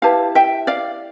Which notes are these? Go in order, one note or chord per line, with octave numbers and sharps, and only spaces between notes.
E4 G4 B4 F5 A5
E5 G5
D5 F5